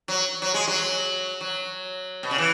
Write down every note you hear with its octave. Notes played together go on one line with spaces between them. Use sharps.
F#3
F#3
G#3
F#3
F#3
B2
C#3
E3